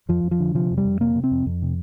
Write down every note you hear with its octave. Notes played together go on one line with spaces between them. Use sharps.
F2 F3
F2
F3
D3
C3 F3
F2
G3
F2
C3 A#3
C3
C4
F2
F2
C3